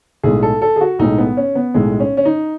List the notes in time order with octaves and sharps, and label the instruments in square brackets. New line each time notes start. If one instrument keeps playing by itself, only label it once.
[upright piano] B1 A2 G#3 G#4
A4
A4
G#4
F#4
B1 A2 G#3 D#4
B3
C#4
B3
B1 A2 G#3
C#4
C#4
D#4